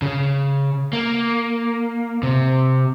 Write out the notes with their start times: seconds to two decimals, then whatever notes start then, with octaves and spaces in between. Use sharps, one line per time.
0.02 C#3
0.93 A#3
2.23 C3